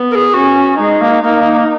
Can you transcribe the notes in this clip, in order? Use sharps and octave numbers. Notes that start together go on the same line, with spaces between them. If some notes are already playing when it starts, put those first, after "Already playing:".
Already playing: B3
A#4
G#4
C#4 F#4
G#3 D#4
A#3
A#3